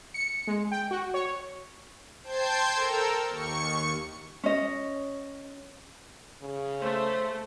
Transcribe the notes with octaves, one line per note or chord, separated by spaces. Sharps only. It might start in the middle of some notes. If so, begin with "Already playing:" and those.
C#7
G#3
G5
F#4
C#5
C5 G5 A5 G6 G#6 C7
A4 A#4 G5 E6
D#2 C#6 C#7
C#4 D#5
C#3
A3 C5